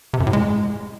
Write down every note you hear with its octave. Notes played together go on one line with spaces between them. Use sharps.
C3
F#2
A2
G#3